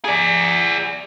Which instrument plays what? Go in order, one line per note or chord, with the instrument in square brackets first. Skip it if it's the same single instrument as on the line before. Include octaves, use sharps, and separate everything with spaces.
[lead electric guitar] G#4 D5